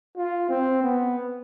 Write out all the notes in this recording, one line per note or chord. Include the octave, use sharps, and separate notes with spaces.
F4
C4
B3